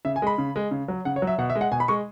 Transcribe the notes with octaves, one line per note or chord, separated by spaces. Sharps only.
C#3 E5
G#5
G#3 B5
C#3
G#3
C#3
F#3
C#3 F#5
C#5
F#3
E5
B2 F#5
E5
G#3
F#5
B2 G#5
B5
G#3 C#6